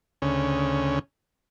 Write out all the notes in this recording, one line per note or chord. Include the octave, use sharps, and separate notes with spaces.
D2 C#3 C#4